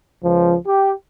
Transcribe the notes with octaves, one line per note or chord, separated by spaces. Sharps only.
C#2 F3
G4